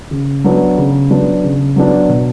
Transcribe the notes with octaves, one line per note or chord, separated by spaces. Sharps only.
C#3
F#3 B3 D4
C#3
F#3 B3 D4
C#3
F#3 B3 D4
B2